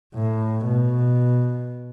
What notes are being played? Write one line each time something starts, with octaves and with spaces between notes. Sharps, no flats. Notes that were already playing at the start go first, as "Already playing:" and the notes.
A2
B2